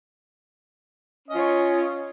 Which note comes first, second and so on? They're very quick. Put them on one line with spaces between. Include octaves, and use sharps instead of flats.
C#4 D#5 F4 C#5